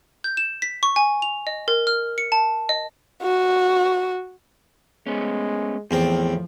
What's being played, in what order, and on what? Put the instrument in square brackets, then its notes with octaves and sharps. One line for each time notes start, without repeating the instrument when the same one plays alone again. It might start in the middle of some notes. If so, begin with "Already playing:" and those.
[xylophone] G6
E7
B6
C#6
G#5
F7
D#5
A#4
F6
C#7
A5
D#5
[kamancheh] F#4
[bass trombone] G#3 [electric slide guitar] A3 B3 C#4
[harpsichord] E2 C4 [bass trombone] A2 [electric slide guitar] F3